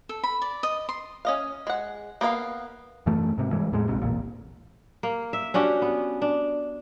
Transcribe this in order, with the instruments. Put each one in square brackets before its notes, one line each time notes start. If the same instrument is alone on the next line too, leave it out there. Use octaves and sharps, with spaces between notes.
[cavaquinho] A4
B5
D5
D#5
C6
[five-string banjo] C#4 D#5 F5
G#3 F#5
A#3 B3 C#5 F5
[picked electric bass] F#2 E3 A3
G#2 C3
G2 E3 G#3
E2 A2 G#3
A#1 G#2 C3
E1 A1 A#2
[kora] A#3
E5
C#4 D4 F#4 G4
B3
D4